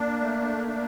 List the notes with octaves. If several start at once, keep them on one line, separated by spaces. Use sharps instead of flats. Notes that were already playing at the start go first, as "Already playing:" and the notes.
Already playing: A#3 D4
A3
D4